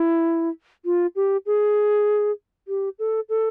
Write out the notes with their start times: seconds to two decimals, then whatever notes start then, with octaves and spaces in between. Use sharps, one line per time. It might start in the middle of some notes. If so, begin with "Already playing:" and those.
Already playing: E4
0.85 F4
1.16 G4
1.46 G#4
2.68 G4
2.99 A4
3.29 A4